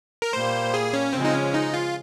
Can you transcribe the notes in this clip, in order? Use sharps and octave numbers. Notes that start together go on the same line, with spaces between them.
A#4
A#2 G3 A#3 C5
G#4
C#4
C#3 F3 G#3 C4
D#4
C#4
D#4
F4